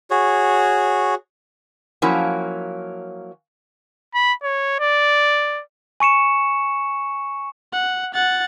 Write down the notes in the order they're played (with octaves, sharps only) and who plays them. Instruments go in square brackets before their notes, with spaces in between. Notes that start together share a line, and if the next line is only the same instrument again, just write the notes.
[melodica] F#4 G#4 C#5
[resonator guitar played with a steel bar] F3 F#3 A#3 C#4 E4
[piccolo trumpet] B5
C#5
D5
[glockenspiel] G#5 C#6 C#7 E7
[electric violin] F#5
F#5 A6